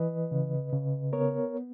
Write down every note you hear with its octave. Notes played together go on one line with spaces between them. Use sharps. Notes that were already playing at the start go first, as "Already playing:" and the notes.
Already playing: E3 B4 D#5
C#3
C#3
B3 A#4 C#5